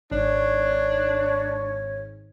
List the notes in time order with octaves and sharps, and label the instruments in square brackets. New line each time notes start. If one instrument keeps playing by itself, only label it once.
[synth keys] G#1 [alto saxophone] D4 [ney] C#5